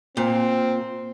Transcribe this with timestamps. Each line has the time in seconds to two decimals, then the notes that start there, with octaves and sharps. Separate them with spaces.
0.17 A#2 C4